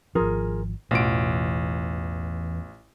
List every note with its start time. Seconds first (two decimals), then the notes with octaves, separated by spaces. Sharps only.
0.15 G#1 F3 F4 G#4 A#4
0.91 A1 E2 B2 E3 F4 F#5 D7